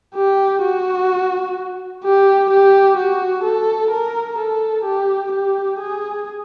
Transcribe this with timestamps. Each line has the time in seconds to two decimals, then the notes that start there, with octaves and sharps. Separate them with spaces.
0.15 G4
0.62 F#4
2.04 G4
2.50 G4
2.97 F#4
3.44 A4
3.91 A#4
4.38 A4
4.85 G4
5.32 G4
5.79 G#4